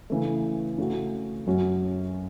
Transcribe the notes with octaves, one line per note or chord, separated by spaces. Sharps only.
C#3 E3 A3
C#3 A3 F#4
F#2 F#3 C#4 F#4